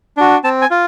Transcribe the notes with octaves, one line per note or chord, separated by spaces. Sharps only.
D4 F#4
C4 A5
G#5
F4